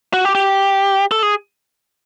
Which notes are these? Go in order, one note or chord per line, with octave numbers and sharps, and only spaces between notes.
F#4
G4
G4
A4
G#4